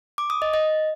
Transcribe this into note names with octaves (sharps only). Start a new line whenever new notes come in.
D6
D#6
D#5
D#5